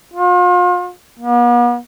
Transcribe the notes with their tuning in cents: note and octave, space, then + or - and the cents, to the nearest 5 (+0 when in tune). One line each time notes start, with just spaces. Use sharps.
F4 +40
B3 -45